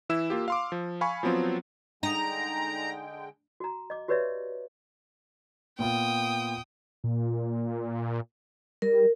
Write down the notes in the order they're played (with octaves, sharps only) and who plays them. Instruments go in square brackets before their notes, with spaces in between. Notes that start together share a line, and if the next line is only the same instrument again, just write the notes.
[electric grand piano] E3 E4 E6 E7
A#3 F4 G4
F5 C6 D6
F3
F5 G#5 B5 C#6
F3 F#3 B3 C4 F4
[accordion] D3 G#3 G5 [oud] D#4 [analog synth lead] A#5
[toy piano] F#4 A#5
D#5 D6
F#4 G4 B4 C#5 D5 E5
[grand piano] A#2 B3 F4 [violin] G5 D#6
[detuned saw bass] A#2
[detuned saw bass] G3 [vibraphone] A#4